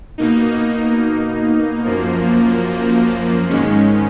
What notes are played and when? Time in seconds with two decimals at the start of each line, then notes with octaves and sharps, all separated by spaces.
0.18 B2 A#3 D#4
1.84 F#2 F3 A#3
3.49 G#2 D#3 G#3 C#4